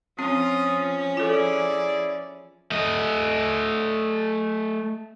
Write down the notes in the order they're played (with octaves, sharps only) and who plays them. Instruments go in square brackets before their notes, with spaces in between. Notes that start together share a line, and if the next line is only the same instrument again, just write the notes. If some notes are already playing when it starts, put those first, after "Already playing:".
[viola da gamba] F3 C#4 [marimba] C4 [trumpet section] F4 D#6
[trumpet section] E4 G#4 D5 [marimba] F4 A4
[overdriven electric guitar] A3 D#5